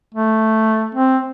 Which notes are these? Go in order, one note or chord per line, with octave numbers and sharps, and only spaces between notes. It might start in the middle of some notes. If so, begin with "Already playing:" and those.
A3
C4